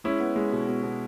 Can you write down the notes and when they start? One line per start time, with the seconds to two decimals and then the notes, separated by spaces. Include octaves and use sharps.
0.04 G#3 C#4 E4
0.20 B3
0.36 G#3
0.52 B2
0.68 B2
0.83 B2